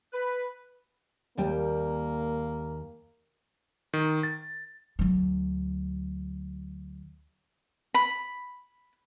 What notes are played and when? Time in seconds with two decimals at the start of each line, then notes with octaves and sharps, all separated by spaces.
0.13 B4
1.37 D#2 G3 A#3 G5
3.93 D#3
4.23 A6
4.99 D2 F#3
7.94 B5